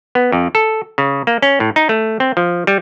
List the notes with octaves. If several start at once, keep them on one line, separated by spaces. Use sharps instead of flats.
B3
F2
A4
C#3
A#3
C#4
A2
D#4
A3
C4
F3
G3